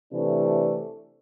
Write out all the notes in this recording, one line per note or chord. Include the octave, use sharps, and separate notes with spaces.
C3 E3 A3 D4